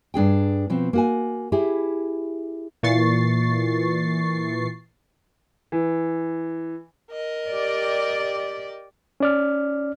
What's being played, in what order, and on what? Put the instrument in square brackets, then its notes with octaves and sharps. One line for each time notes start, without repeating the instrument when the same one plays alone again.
[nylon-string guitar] G2 D4 G#4 G5
B2 F3 C4
A#3 F#4 G#5
E4 G4 G#4
[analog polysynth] A#2 E3 C#6 A6 C7
[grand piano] E3
[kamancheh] A#4 D#5
[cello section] G4 D5
[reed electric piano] C#4 D5 F6